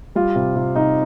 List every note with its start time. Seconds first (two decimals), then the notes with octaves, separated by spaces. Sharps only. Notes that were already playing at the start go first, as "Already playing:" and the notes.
0.15 G3 F4
0.36 C3
0.56 C3
0.76 C3 D#4